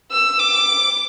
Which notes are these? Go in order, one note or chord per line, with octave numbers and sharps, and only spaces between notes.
E6
D6